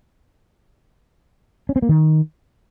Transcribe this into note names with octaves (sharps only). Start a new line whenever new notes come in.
C#4
C4
A#3
D#3